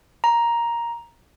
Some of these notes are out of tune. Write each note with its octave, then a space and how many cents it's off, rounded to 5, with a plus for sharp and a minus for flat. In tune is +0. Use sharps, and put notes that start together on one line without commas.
A#5 +10